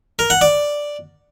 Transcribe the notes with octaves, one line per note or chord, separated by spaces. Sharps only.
A#4
F#5
D5